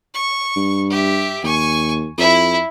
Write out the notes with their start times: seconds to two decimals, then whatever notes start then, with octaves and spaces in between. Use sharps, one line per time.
0.14 C#6
0.56 G2
0.90 G4 E5
1.43 D#2 G#5 C#6
2.18 F2 E4 E5